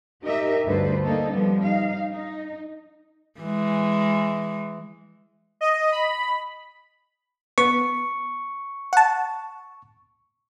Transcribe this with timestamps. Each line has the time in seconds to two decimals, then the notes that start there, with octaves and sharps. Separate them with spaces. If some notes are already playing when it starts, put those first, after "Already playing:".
0.24 D#4 G4 A#4 D#5 E5
0.65 D2 G2 D3 A4 B4 C5
1.02 A3 A#3 D#4 A4
1.32 F3 G3 B3
1.63 D#4 F5
2.13 D#4
3.40 E3 G#3
5.61 D#5
5.92 B5
7.58 B3 C#6
8.93 F#5 A5